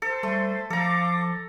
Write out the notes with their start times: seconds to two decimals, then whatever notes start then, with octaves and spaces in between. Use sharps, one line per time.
0.02 A4 C5
0.23 G3 A3
0.70 F3 A4 F5 A#5 D6